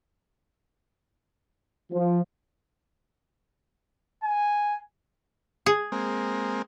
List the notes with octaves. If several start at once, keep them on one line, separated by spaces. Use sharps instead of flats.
F3
G#5
G#4
G#3 A#3 C4